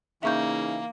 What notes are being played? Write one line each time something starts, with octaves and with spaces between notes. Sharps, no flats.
C#3 E3 A#3 D#4 E5 F5 C#6 G6